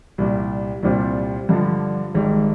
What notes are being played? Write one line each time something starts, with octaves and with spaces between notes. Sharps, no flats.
C2 A#2 G3
C2 A#2 G3 C4 F4
G2 D3 F3
G#1 G#2 G3